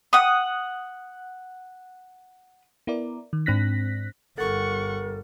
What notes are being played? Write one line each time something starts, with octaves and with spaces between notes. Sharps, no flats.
F#5 D#6
B3 E4 A#4 D5
D#3
G#2 C4 D4 F#6 A#6 B6
G1 G3 A4 A#4 F#5 C#6 A6